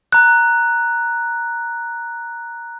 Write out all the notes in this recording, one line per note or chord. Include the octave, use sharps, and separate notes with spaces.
A#5 F#6